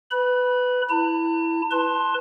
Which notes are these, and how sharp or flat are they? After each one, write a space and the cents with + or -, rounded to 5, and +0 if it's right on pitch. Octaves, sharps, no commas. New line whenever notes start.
B4 +15 B5 -15
E4 +0 A5 +45
B4 +0 A5 +0 C6 +15